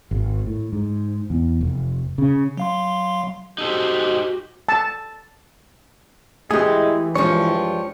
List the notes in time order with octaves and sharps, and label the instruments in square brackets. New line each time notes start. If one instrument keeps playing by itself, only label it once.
[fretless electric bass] G#1
A2
G#2
E2
F1
C#3
[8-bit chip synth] F#3 F5 C6
[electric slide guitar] D#4 A4 C5 [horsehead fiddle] F#4 G4
[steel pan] A5
[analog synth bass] E3 [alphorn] G#3 [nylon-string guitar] A3 E4 G4 [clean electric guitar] G#4
[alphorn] G2 [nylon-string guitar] F3 G#3 D4 [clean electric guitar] C#5